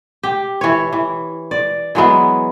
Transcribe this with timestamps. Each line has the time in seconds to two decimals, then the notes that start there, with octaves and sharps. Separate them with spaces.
0.23 G4
0.61 E3 C#5
0.93 E3
1.51 D5
1.95 E3 F#3 G#3 B3